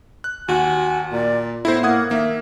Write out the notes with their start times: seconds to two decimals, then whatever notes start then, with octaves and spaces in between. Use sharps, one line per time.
0.24 F#6
0.48 D#2 F#4 G#5
1.12 A#2 D5
1.65 A2 B3 E4 C5
1.83 A#3 F#5 D#6 G#6
2.11 D#3 A#3 E5